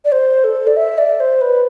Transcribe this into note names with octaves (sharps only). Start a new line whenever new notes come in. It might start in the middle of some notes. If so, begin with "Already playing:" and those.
D5
C5
A4
D5
E5
D5
C5
B4